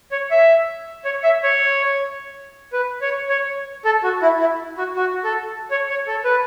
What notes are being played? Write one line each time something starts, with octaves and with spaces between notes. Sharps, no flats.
C#5
E5
C#5
E5
C#5
B4
C#5
C#5
A4
F#4
E4
E4
F#4
F#4
A4
C#5
C#5
A4
B4